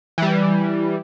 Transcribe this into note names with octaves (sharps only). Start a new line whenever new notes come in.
E3 G3